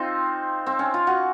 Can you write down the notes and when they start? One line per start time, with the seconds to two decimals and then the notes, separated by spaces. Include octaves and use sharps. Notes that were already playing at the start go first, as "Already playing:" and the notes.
Already playing: C4 D#4 F4
0.66 C4
0.79 C#4
0.94 F4
1.07 F#4